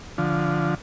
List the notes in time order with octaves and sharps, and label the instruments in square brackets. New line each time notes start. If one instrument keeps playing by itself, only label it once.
[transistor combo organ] D3 F3